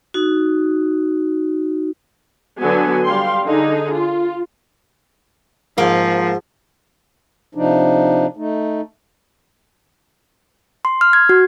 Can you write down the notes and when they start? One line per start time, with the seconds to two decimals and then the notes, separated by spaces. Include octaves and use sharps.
0.14 D#4 F#4
2.59 D3 F#3 B3 F#4 G#5
3.05 G3 F5 G5 C6
3.45 D3 D#4 G#4
3.93 F4
5.78 G#2 F3 A#3
7.55 C3 F3 D4 D#4
8.37 A3 D#4
10.85 C6
11.01 F6
11.13 G#6
11.29 F#4